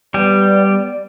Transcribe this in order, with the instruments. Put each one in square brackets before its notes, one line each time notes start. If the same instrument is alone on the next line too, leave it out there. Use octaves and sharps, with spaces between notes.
[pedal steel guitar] G3 G4 [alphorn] B3 [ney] D5